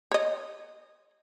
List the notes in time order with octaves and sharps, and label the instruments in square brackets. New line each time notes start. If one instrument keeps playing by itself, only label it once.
[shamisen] C#5 D#5